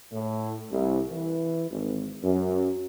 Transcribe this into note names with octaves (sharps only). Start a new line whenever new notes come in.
A2
C2
E3
G#1
F#2